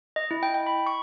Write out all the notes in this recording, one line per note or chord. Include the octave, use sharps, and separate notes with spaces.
D#5
E4
G5
G5
B5
C#6